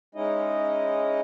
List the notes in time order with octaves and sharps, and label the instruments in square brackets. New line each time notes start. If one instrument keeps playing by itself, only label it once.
[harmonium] G#3 C#4 D#4 E4 D#5